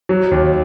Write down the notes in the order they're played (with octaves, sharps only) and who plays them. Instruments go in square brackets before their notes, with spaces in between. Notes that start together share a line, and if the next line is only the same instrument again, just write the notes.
[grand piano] F#3
D#2